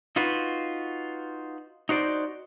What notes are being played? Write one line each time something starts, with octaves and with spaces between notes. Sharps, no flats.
D#4 F4 F#4 B4
D#4 F#4 C5 D5